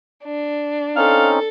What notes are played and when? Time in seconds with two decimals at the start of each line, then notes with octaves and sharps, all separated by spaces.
0.24 D4
0.96 C4 C#4 D#4 A4 F5